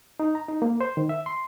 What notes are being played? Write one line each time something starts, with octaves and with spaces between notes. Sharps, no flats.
D#4
A#5
D#4
A#3
C5
D#3
E5
C6